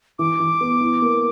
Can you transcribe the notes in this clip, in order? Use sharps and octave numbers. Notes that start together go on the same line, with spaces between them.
E3 D6
E3
B3
E4
A#3